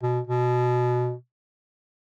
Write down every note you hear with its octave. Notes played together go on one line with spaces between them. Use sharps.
B2
B2